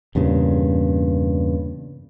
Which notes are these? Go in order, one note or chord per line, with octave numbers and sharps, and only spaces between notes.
E2 G2 A#2 C#3